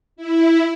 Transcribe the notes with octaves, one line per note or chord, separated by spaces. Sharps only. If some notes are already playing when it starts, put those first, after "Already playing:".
E4